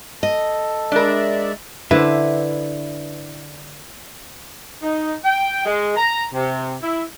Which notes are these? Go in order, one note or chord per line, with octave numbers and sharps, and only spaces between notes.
A4 D#5
G#3 D4 A#4 D5 E5
D3 E4 B4 C5 E5
D#4
G5
G#3
A#5
C3
E4